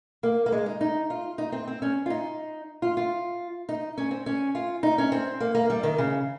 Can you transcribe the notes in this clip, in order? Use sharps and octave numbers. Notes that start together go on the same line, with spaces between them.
A#3
A#3
G#3
D#4
D#4
F4
D#4
C4
C4
C#4
F4
D#4
F4
F4
D#4
C#4
C4
C#4
F4
D#4
C#4
C4
A#3
A#3
G3
D#3
C#3